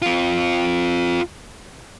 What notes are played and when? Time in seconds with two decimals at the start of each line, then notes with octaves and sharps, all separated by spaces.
0.02 C4 F4